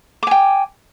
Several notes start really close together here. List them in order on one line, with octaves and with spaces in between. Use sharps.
D6 G#5 G5